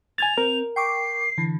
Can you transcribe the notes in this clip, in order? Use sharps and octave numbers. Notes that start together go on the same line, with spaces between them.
G#5 G#6 A6 F7
C4 A#4
G5 C#6 D6 C7
D3 E3